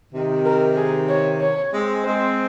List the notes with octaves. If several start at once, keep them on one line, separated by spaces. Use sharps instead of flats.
C3 D#3
A#4
G#4
C#5
C#5
G#3 C4
G#3 C4 C5